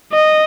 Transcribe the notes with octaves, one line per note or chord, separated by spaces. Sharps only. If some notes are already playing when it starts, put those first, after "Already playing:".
D#5